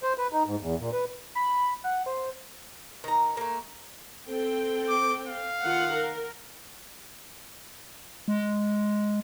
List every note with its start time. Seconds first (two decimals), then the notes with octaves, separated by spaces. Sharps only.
0.03 C5
0.18 B4
0.33 D#4
0.46 G#2
0.61 E2
0.80 A#2
0.92 B4
1.35 B5
1.84 F#5
2.06 C5
3.04 D#3 A#5
3.37 A3 A#3
4.27 C4 A4 G5
4.89 D6
5.28 F5
5.61 D#3 F4 F#5
5.94 A#4
8.28 G#3